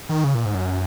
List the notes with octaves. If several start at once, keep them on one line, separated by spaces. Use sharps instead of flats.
D#3
C#3
A#2
G#2
F#2